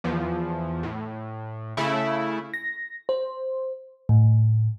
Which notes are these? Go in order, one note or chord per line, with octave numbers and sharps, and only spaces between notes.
E2 F3
A2
C#3 A3 E4
A#6
C5
A2